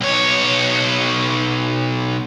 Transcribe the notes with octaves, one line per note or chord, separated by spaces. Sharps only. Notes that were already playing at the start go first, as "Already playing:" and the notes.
B1 C#5